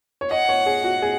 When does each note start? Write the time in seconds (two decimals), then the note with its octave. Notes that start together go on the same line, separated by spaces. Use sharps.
0.21 C#5
0.31 D#5 F#5
0.49 C#5
0.66 G#4
0.84 F#4
1.02 G#4